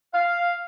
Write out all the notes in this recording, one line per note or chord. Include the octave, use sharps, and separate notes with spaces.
F5